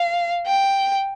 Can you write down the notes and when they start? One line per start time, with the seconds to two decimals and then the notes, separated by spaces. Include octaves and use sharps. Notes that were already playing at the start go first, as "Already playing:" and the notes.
Already playing: F5
0.47 G5